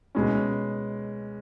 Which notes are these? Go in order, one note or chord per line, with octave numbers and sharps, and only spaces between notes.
B2 G#3 C#4